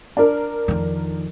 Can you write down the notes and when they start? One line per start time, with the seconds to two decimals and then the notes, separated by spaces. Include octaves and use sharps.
0.17 D4 A#4
0.68 F2 D#3